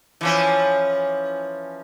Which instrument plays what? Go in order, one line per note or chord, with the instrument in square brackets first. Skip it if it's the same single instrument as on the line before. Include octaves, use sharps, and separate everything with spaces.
[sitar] E3 F3 C#4